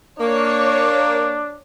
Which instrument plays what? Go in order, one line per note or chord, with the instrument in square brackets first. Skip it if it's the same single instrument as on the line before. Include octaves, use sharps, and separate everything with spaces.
[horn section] A#3 [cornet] D4 [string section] C#5